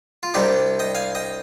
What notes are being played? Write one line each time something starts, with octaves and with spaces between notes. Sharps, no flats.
F4
C2 C3 G3 D4 D#4 G4
D#5 G5
F5 G#5
D#5 G5